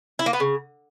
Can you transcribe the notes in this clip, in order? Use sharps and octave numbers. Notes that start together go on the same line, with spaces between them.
E4
A#3
B3
C#3